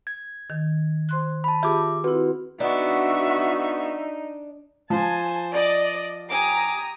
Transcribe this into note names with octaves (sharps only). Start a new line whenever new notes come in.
G#6
D#3
C5 C6 F#6
A5 B5
F4 G4 G#4 E5 D6
C4 E4 F#4 B4
B3 D4 D#4 F#4 E5 C#6
F3 C5 G#5 A5
D5 D#5
G4 G#5 A#5 D6 D#6